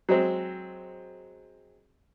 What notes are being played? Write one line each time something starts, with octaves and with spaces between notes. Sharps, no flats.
F#3 G#3 C4